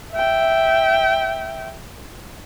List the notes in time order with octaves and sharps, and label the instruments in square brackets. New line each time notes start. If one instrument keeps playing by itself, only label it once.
[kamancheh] E5 G5